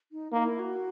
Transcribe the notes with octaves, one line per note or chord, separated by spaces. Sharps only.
D#4
A#3 D#4
E4
F#4